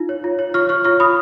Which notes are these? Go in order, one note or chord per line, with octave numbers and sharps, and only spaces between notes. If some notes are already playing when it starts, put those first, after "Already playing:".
Already playing: D#4 F4
C#5
F4
C#5
F4 C#6 F6
C#5 C#6 F6
F4 C#6 F6
F4 B5 D#6